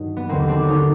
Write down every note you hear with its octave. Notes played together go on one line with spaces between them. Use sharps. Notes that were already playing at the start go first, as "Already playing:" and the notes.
Already playing: G2 D#3 F#3
B3
D#2 D3 F#3 A#3 C4
C4 D4
C#4 D#4